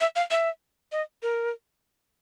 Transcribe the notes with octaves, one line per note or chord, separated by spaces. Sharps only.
E5
F5
E5
D#5
A#4